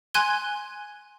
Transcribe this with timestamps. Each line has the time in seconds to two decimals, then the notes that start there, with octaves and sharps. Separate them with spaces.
0.14 G#5 C6 F#6 G#6 D#7 G7